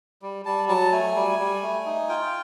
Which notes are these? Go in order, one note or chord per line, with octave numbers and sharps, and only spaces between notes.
G3
G3 A5
F#3 A5
A3 G#5
G3
G3
A3
D#4
F4 G5